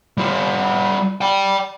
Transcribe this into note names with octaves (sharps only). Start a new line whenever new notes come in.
G3 F4
D5 G5